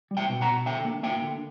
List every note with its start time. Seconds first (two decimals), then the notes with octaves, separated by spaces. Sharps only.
0.11 G3
0.17 E5 G5
0.30 B2
0.41 F#5 A#5
0.48 B2
0.66 D3 E5 G5
0.85 A#3
1.03 A#3 E5 G5
1.22 D3